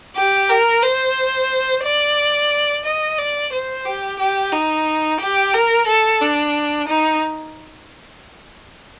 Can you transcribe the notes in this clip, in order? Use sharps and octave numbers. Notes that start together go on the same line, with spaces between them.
G4
A#4
C5
D5
D#5
D5
C5
G4
G4
D#4
G4
A#4
A4
D4
D#4